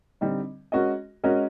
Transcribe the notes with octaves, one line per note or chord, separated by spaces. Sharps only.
D3 G3 C4 D#4
G#3 C#4 F#4 A#4 D#5
G#3 C#4 F#4 A#4 D#5